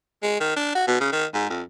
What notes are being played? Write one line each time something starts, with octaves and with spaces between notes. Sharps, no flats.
G#3
D#3
D4
F#4
B2
C#3
D#3
G#2
F2